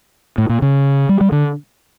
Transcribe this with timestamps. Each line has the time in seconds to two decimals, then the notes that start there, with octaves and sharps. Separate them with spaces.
0.38 A2
0.49 A#2
0.62 C#3
1.09 G3
1.21 G3
1.32 D3